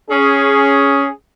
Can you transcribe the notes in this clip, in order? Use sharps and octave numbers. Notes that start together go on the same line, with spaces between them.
C#4 G#4